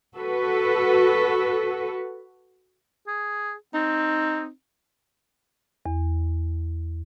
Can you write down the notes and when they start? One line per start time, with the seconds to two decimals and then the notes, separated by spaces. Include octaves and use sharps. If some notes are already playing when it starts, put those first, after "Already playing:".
0.17 F#4 A4 B4
3.07 G#4
3.74 C4 D#4
5.86 E2